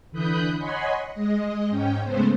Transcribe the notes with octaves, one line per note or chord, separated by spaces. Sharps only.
D3 E3 B5 D#6 F#6 G6
C#5 D#5 F#5 G#5 B5 C6
G#3 D#5
G#2 C#4 G5
C#3 G#3 A3 B3 C5